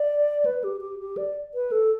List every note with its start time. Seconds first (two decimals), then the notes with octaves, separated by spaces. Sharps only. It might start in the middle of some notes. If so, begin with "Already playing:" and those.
Already playing: D5
0.45 B4
0.64 G4
0.81 G4
1.00 G4
1.17 D5
1.54 B4
1.72 A4